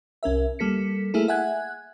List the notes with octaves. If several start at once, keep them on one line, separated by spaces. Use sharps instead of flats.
C2 C#4 A#4 E5
G3 A#3 A4 B6 C#7
A3 A#3 E4 G#4 A4
E5 F#5 G#5 F#6 G#6